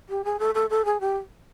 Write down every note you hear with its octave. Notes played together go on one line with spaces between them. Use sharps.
G4
G#4
A4
A4
A4
G#4
G4